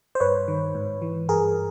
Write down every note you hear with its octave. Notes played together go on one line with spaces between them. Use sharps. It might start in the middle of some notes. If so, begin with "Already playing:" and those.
C5
G2 B4 C#5
D#3
G#2
E3
G2 G#4 A#4